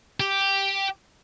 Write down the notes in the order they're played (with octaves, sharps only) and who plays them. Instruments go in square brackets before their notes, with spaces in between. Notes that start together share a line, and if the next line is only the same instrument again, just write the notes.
[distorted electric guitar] G4